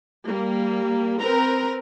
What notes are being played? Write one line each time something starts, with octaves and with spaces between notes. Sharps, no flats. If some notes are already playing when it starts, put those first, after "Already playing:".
G3 A#3
C4 A#4 B4 A#5